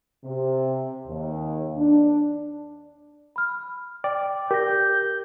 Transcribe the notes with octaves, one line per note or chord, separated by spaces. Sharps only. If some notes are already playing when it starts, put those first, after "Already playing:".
C3
D#2
D4
B5 F6
D5 G5
G4 A#4 G6 A#6